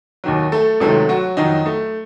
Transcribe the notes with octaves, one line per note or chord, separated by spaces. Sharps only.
D#2 D#3 F#3
A3 A4
C#2 C3 D#3 F#3 A3 A4
F#3 F#4
F2 D#3 F#3 D#4
A3